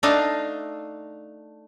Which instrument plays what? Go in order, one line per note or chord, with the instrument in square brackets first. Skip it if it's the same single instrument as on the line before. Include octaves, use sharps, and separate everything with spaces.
[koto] A3 D4 D#4 F5